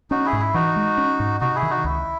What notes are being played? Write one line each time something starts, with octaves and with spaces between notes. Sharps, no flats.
C#4 D#4 F#4
E4 G#4
G#2
E4
E3 D#4 F#4
G#3
C#4
G#2
C3 D#4 F#4
E4 G#4
D#3
D#4 F#4
C#2 E4